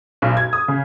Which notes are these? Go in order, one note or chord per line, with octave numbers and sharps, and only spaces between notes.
B1
G#6
D#6
C#3